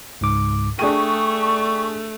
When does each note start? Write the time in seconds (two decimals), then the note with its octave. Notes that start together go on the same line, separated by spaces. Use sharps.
0.21 C#2 G#2 D6
0.79 A3 D4 G#4 G5 C#6 D#7